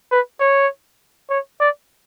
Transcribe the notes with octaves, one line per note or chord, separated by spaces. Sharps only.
B4
C#5
C#5
D5